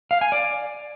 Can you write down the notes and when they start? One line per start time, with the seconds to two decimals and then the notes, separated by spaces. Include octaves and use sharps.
0.11 F5
0.21 G#5
0.32 D5